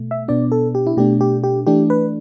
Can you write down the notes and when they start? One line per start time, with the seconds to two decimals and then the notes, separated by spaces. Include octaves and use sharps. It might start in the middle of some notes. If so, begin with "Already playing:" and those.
Already playing: B2 A3
0.11 E5
0.28 B2 B3 D4 D5
0.52 A4
0.75 G4
0.87 E4
0.97 B2 A3 D4 G4
1.21 G4
1.44 G4
1.66 E3 A3 D4 G4
1.90 B4